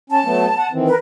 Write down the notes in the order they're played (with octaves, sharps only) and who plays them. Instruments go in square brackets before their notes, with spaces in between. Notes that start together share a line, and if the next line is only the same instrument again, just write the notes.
[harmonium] C#4 [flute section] A5
[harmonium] F#3 A3 B3
F#5
D#3 E3 C4
[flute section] A#4 B4